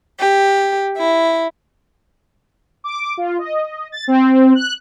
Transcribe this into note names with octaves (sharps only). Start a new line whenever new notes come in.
G4
E4
D6
F4
D#5
A6
C4
F#6